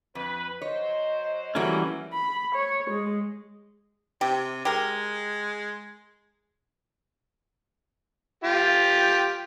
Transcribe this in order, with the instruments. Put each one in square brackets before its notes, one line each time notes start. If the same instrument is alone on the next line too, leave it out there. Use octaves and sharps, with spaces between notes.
[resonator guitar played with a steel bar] F2 [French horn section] B4
[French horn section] F#3 C5 [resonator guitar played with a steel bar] C#5 [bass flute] D#5
[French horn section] F#2 [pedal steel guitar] E3 G3 C#4 [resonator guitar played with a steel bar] A3 A#3 F#4
[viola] B5
C#5
G#3
[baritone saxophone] C3 [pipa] G4
[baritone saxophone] G#3 [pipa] G4 A#4
[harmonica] F4 G4